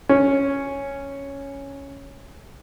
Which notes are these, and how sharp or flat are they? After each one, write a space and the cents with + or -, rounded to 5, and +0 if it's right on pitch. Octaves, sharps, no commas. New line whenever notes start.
C#4 +0